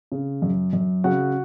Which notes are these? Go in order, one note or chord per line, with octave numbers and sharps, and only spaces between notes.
C#3
F#2
F#2
C#3 F#4 F#5